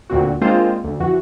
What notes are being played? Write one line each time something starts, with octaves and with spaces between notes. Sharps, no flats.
D2 A#2 C4 F#4
G#3 A#3 C4 D4 F4 C5
D2
F2 E3 F#4